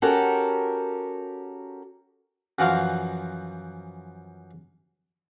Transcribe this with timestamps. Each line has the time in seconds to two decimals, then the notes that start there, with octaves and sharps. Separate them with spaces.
0.02 C#4 F#4 G4 A4 A#4
2.59 F#2 E3 F3 F#4 F5